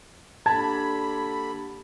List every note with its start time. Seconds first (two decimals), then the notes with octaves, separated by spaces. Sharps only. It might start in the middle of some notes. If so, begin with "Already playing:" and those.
0.46 D3 A#3 D4 G4 A5 B5 G#6